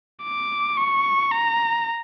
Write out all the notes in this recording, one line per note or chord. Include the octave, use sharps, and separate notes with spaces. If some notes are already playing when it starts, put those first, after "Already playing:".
D6
C#6
A#5